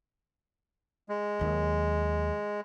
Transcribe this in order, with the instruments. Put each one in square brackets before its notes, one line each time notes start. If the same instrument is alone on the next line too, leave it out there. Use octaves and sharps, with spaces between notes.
[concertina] G#3
[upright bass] D#2 F#3